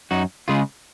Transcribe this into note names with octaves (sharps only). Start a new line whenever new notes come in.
F#2 D#4 F#4
C#3 G#3 F4 G#4